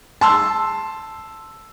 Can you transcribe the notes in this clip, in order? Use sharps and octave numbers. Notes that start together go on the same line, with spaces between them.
A5 C6 E6